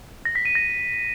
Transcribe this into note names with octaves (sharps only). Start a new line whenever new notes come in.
A#6
B6
D#7
A#6